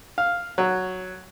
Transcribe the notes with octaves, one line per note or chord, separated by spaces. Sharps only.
F5
F#3